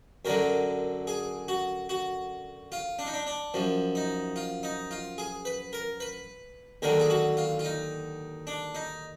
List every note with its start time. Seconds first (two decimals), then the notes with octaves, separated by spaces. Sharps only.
0.25 F#2 D3 F#3 A#4
1.07 G#4
1.48 F#4
1.89 F#4
2.72 F4
2.99 D4
3.06 D#4
3.13 D4
3.27 D4
3.54 F#2 F3
3.95 D#4
4.36 F4
4.63 D#4
4.91 F4
5.18 G#4
5.45 B4
5.73 A#4
6.00 B4
6.82 D#2 D3 F#3 A#4
7.00 G#4
7.10 F#4
7.37 F4
7.59 F4
7.65 D#4
8.47 D4
8.75 D#4